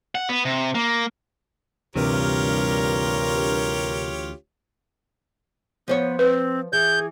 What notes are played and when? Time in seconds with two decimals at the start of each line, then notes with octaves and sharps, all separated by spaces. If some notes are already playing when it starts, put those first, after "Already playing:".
0.15 F#5
0.29 B3
0.45 C3
0.75 A#3
1.96 D2 G2 C3 E3 F4 G4 A#4 C#5
5.88 F3 B3 C5 C#5
6.19 C4 B4
6.73 E3 G#4 G6